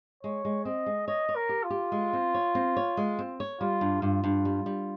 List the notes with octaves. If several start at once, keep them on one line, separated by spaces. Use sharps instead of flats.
G#3 C#5
G#3
C4 D#5
G#3
C#5 D#5
C#5
A#4
G4
F4
G4
G#3
C4
C#5
C4
C#5
G#3
C4
C#5
G3 F4
G2
G2 F4
G2
G3
G3